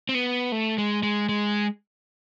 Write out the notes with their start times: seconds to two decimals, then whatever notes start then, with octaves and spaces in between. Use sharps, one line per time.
0.09 C4
0.15 B3
0.52 A3
0.78 G#3
1.03 G#3
1.29 G#3